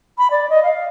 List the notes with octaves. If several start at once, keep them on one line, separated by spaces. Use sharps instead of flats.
B5
D5
D#5
F5